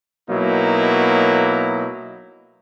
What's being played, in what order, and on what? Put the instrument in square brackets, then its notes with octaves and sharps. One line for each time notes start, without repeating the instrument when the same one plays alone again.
[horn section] B2 F#3 A#3 D#4 E4